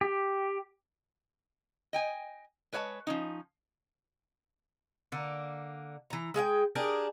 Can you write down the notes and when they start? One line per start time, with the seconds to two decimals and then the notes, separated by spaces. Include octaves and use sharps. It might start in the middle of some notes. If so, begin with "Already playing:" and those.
0.01 G4
1.93 D#5 G5 G#5
2.72 G#3 B4 C#5 E5 A5
3.07 F3 C#4 D#4
5.12 D3 A#3
6.10 E3 A#5
6.34 G#3 G#4 F5 G5
6.75 D4 G4 G#4 A#4